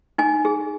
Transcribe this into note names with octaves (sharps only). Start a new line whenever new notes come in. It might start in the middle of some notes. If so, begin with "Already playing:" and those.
D#4 G#5
G#4